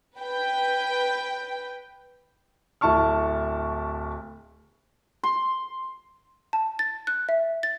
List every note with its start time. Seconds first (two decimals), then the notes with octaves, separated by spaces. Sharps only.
0.17 B4 G5
2.81 D1 E4 A5 C#6 F6
5.23 C6
6.53 A5
6.79 A6
7.07 F#6
7.29 E5
7.63 A6